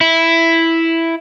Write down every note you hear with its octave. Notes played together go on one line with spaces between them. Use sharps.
E4